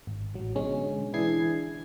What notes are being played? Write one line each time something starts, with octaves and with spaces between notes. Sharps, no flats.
G#1
A1 F#3
B2 D3 G#3 C#4
E3 D4 E4 G#4 G#6 C7